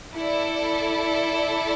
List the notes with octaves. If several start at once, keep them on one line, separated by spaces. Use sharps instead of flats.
E4 A4 D5